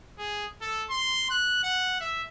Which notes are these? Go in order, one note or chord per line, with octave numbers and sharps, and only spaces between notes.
G#4
A4
C6
F#6
F#5
E5